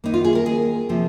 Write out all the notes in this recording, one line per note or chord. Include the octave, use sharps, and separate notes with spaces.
D#3 A#3 D#4
F4
G#4
A#4
G#4
C3 F3 A#3